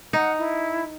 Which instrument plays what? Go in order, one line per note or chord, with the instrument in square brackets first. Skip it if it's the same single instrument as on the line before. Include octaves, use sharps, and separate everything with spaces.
[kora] D#4 [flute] F#5
[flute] E4